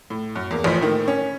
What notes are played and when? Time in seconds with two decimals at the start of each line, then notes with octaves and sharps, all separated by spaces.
0.10 A2
0.36 F#2
0.51 E2 A#3
0.64 A1 A2 E3 F3 C5 B6
0.81 A2 D#3 A#3
1.08 C#4